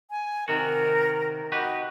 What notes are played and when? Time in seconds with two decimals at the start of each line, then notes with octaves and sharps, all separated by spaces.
0.11 G#5
0.48 C3 D#3 F#4 A#4
1.52 F#4 G4 B4 D#5